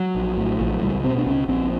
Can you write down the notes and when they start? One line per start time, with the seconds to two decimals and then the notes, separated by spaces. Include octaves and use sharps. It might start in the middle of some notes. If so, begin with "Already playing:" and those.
Already playing: F#3
0.15 A#1
0.37 A2
0.60 A#1 F3
0.72 F#3
0.82 C#2 G3
1.04 B2 C4
1.18 D4
1.26 C#2 C#4
1.48 A#1 C4